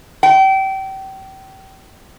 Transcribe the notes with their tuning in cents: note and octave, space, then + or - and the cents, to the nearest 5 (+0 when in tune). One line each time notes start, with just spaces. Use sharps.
G5 -30